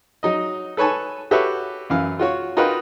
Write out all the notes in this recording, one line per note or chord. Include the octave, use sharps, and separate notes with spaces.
F#3 D#4 D#5
A4 B4 C#5 G#5 A5
F#4 G4 A4 B4 C#5 E5
F#2 E3 F5
F4 F#4 C#5
D#4 F4 F#4 A#4 B4 G5